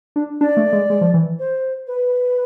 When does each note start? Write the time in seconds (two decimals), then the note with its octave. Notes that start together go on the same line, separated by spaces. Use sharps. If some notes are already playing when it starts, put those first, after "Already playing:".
0.16 D4
0.41 D4 D5
0.57 A3
0.73 G#3
0.90 G#3
1.01 F3
1.14 E3
1.38 C5
1.87 B4